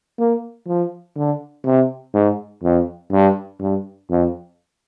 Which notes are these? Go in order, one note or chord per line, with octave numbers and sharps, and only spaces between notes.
A#3
F3
D3
C3
G#2
F2
G2
G2
F2